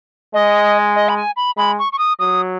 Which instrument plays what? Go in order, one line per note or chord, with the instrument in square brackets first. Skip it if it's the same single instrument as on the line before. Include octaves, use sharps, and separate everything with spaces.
[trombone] G#3 [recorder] D#5
[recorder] D#5
B5
G#5
B5
[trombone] G#3 [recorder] B5
[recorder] C#6
C#6
D#6
[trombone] F#3 [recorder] D#6